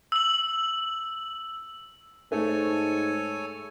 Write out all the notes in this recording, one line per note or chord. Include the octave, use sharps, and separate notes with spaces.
E6 F#7
G#2 A3 A4 C#5 G#5